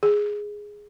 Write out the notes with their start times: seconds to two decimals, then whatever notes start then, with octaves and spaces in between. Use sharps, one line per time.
0.03 G#4